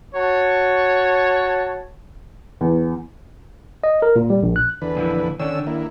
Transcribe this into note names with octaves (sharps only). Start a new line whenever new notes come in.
F#4 C#5 A5
E2
D#5
A#4
A#2
G3
A#1
F#6
E2 D3 B4
A#2 F3 E4
D3 D#3 C#4 D4 E6
A#3 E4